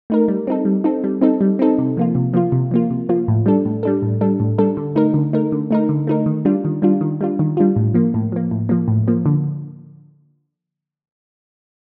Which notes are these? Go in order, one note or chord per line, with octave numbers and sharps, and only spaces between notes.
A3 D#4 A#4
G3
C4 D#4 A4
G3
C4 D#4 A4
G3
C4 D#4 A4
G3
C4 D#4 A4
C3
F3 A#3 F4
C3
F3 A#3 F4
C3
F3 A#3 F4
C3
F3 A#3 F4
A2
G3 D4 A4
A2
G3 D4 A4
A2
G3 D4 A4
A2
G3 D4 A4
D3
A3 D#4 A#4
D3
A3 D#4 A#4
D3
A3 D#4 A#4
D3
A3 D#4 A#4
D#3
G3 D4 F4
D#3
G3 D4 F4
D#3
G3 D4 F4
D#3
G3 D4 F4
A2
F3 A#3
A2
F3 A#3
A2
F3 A#3
A2
F3 A#3
D3